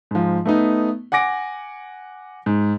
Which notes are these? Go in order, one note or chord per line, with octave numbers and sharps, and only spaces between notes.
G#2 F3
A3 B3 D#4
F#5 G#5 D6 A#6 D7
G#2